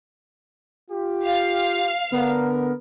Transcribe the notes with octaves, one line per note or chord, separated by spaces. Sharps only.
F4 G4
F5
D3 B3 A#4